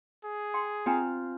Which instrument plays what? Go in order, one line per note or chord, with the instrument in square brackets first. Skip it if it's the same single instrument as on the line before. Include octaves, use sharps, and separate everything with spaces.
[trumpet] G#4
[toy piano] G5 C6
[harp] C4 F4 [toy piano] G5 G#5 A#5